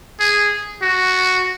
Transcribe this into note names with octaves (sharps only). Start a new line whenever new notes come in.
G#4
F#4